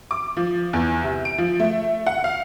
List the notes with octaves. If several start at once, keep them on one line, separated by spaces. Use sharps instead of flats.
D6
F3
E2
C3
D7
F3
A3
F#5
F5